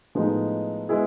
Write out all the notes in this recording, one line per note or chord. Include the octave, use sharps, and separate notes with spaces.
A2 F3 G#3 B3 D#4
G#3 B3 E4 G#4